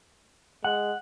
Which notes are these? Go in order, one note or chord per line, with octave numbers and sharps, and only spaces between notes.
G#3 F#5